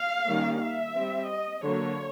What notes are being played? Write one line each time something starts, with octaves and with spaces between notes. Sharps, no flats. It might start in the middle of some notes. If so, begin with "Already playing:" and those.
Already playing: F5
D#3 G3 A#3 C#4
E5
G3 C4
D#5
D3 F#3 A#3 C#5